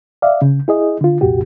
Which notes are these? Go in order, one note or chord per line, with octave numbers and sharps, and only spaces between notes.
D5 E5 F5
C#3
E4 G#4 D#5
D3 F4
C2 F2 A#2 F#4 G4